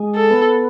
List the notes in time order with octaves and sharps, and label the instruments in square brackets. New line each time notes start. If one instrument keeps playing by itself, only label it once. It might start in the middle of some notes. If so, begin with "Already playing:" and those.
Already playing: [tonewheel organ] G#3
[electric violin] A4
[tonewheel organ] B3